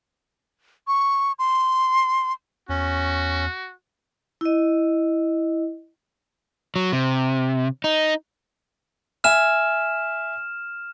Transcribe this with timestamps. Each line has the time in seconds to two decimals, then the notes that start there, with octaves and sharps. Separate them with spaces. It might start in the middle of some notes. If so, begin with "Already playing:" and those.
0.87 C#6
1.39 C6
2.69 E2 C#4 F#4
4.41 E4 D#5
6.76 F#3
6.93 C3
7.84 D#4
9.24 E5 G#5 F6 E7